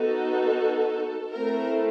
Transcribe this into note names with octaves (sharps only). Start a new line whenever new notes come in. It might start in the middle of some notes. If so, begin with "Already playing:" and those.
Already playing: B3 D#4 F#4 A4
A3 C4 E4 A4 A#4